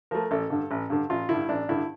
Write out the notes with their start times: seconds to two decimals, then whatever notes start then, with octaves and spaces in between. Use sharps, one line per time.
0.11 F3 A3 A#4
0.31 A1 A4
0.50 G2 D3
0.71 A1
0.90 G2 D3
1.10 A1 F4
1.29 G2 D3 E4
1.49 A1 D4
1.69 G2 D3 E4